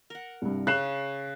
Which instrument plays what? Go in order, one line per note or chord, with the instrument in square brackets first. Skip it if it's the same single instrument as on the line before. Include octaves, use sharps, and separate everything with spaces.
[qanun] A#4 F#5
[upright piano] C2 G2
[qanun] C#3 [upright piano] F#6 C7 E7